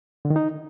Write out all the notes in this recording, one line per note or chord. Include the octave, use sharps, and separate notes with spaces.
D3
D#3
D#4